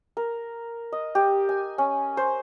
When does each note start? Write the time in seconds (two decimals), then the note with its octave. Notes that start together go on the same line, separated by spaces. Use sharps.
0.17 A#4
0.92 D#5
1.15 G4
1.49 G#5
1.78 C#4
2.17 C5